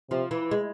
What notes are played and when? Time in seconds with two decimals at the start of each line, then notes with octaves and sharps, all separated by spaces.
0.10 C3 F3
0.31 E3
0.51 G#3